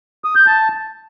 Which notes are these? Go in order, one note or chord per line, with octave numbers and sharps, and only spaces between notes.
D#6
G6
A5